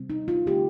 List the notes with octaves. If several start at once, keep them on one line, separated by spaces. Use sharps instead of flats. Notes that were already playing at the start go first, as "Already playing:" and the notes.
Already playing: C3 G3 C4
D#4
F4
D3 A3 C4 G4